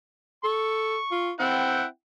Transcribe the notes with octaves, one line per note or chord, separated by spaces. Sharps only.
A4 C#6
F4
C4 E4 F#5 G5